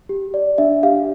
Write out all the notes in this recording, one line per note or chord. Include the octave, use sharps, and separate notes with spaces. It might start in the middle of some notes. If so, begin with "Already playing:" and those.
G4
D5
D4 E5
G4 F5